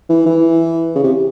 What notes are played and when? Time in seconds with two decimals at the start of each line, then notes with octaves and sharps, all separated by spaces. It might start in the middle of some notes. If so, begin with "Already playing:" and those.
0.09 E3
0.26 E3
0.95 C#3
1.04 C3